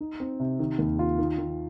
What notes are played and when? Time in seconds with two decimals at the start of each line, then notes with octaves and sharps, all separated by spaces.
0.01 D#4
0.20 C4
0.40 C3
0.59 D#3
0.78 D#2
0.99 F4
1.19 D#3
1.38 D#3